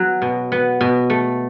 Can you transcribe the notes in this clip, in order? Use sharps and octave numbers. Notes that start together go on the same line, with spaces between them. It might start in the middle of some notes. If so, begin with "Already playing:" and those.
Already playing: F#3 B3
B2
B3
B2
A3